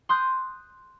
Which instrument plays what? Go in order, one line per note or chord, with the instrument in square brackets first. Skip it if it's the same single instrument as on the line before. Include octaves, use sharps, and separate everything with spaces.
[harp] C6 D#6 F#6 G6